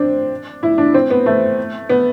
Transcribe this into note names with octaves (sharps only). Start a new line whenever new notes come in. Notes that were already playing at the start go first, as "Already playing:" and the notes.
Already playing: C4 D4
E4
D4
C4
B3
A3
B3